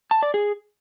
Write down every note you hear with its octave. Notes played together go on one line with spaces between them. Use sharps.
A5
D5
G#4